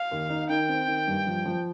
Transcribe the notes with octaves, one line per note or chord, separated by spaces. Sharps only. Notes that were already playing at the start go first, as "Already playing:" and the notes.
Already playing: F5
D#2
D#4
D#3 G5
C4
D#3
G2
F3
F3